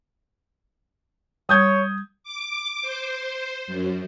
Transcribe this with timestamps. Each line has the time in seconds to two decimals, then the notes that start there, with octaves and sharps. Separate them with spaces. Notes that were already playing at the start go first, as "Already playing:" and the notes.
1.49 G3 C#5 D#6 G6 G#6
2.24 D6
2.82 C5
3.67 F#2